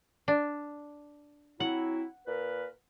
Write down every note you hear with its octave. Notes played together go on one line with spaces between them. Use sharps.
D4
F#3 C4 E4 F#5
A#2 A#4 B4